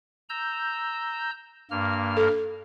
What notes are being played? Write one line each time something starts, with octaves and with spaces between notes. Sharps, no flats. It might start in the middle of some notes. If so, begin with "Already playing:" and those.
A#5 E6 G6
G2 A#3 F6
A4